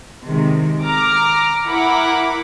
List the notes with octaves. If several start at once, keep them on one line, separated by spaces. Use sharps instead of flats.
C3 D#3 G#3
A#5 D6 F6
E4 A#4 F#5 B5 D6